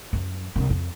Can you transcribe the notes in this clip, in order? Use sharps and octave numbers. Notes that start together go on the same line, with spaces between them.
F#2 F#3
C2 G2
F2